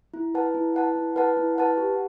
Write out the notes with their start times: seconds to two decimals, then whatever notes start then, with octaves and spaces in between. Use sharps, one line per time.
0.14 E4
0.35 B4 F#5 A5
0.54 E4
0.75 B4 F#5 A5
0.96 E4
1.16 B4 F#5 A5
1.37 E4
1.58 B4 F#5 A5
1.77 G4